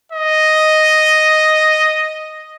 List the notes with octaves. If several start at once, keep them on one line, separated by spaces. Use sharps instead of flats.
D#5